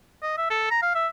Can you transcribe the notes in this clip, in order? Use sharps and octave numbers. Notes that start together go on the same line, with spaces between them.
D#5
E5
A4
A#5
F5
E5